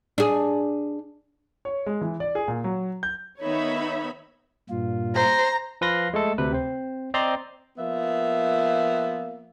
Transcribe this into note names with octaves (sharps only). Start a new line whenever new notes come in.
D4 G#4
C#5
G#3
E3
D5
G#4
A#2
F#3
G6
D#3 B3 D#4 C#5 E5 B5
G2 A#2 F4
C5 A#5
F3 B4 F5 C6 A#6
G#3 A3 A4
D2 C3 B4
C4 C5
C4 C5 D5 D#5 A#5 C6
F3 A#3 B3 E5